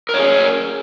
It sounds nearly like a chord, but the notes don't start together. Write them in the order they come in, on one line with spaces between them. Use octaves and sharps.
A#4 C#5 G#4